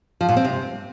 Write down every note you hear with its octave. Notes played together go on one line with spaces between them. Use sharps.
F3
A#2
C4
C3